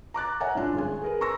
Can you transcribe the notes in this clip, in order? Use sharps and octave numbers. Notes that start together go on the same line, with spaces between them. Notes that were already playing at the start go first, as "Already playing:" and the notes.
A#5 D6 F#6 A6
C#5 E5 F#5 G#5 A#5
A2 G3 C#4 D4 F4
G#1 G#4 G#5
G#4 A#4 B4
A#5 C6 C#6 E6 A#6